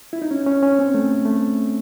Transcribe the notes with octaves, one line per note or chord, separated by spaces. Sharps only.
E4
D#4
C#4
C#4
C#4
C4
A3
A3